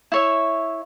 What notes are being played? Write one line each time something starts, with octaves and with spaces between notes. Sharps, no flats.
E4 C#5 E5